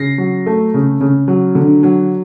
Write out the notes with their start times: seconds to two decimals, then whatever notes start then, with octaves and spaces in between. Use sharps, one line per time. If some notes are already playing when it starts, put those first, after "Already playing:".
Already playing: C#3 A#6 C7
0.18 F#3
0.46 A3
0.74 C#3
1.01 C#3
1.28 F#3
1.55 D3
1.83 F#3